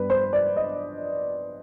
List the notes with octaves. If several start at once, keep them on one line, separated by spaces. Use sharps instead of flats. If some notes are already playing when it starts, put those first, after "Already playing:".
Already playing: G2 G3 B3 D4 B4
C5
D5
D#5